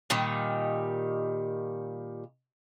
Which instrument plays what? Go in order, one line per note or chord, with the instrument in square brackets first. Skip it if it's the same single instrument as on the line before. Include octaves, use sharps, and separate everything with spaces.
[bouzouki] A#2 D#3 G3